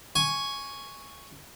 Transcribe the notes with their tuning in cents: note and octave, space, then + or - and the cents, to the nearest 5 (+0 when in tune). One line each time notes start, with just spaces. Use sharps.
G#5 +0 C#6 +0